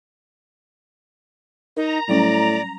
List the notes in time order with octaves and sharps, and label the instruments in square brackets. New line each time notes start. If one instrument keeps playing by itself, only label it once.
[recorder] D#4 [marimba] A#4 [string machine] A#5
[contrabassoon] A2 [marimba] F#3 G3 C#4 [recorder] D5